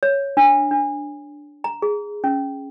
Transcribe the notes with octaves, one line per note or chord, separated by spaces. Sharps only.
C#5
D4
D4
A#5
G#4
C#4